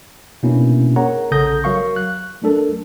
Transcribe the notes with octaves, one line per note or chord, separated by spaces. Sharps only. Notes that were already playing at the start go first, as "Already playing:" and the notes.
B2 A#3 C#4 D4 E4
G#4 A#4 C#5 F#5 A#5
A#1 C#3 A4 D#6 G6 A#6
F#3 A#4 F5 C#6
F#6
F#3 A3 D4 A4 A#4